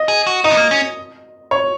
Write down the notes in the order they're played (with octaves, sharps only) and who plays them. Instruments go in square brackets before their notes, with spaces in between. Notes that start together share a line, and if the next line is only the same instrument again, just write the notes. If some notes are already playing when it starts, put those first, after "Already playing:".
Already playing: [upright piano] D#5
[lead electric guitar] G#4
F#4
[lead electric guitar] D#4 [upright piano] D#5
[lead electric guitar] B3
A#3
C#4
[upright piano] C#5